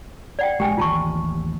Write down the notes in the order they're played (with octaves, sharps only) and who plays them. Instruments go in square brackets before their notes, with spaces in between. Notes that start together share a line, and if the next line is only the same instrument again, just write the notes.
[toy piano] D5 F#5 G5
[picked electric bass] A#1 G#3 [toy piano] G4 G5 G#5
[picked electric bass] A1 D#2 [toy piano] F4 A5 C#6